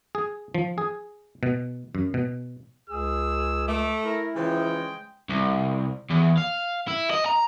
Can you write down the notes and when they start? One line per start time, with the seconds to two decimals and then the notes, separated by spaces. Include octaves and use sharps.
0.15 G#4
0.55 F3
0.78 G#4
1.43 B2
1.95 F#2
2.14 B2
2.90 C#2 G#4 E6
3.68 A3 A4 D6
4.04 E4 A#4
4.35 C#3 E3 F3 G#3 G5
5.30 C2
6.10 E2
6.38 F5
6.88 E4
7.11 D#5
7.26 A#5